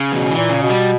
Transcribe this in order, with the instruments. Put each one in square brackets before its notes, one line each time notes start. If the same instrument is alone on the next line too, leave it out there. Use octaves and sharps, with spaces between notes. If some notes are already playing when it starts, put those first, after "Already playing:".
Already playing: [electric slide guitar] C#3
[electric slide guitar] E2 [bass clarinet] B2
[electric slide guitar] E3
[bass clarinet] A#2
[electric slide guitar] C#3
[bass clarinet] B2
[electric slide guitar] G3